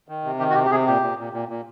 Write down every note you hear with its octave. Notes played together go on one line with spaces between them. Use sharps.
D#3
C3
D#3 G4
F#4
C3 G4
G4
C3 G#4
A#2 G4
A#2
A#2
A#2
A#2